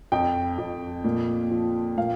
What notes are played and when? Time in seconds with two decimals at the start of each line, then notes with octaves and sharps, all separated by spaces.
0.12 F2 G5
0.58 F2
1.04 A#2
1.51 F3
1.98 A#2 F5